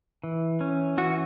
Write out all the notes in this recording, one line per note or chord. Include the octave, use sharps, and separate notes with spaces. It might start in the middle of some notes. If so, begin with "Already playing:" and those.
E3
C#4
E3 F#4